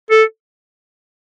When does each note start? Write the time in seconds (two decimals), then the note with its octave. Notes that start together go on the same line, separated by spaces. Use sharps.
0.11 A4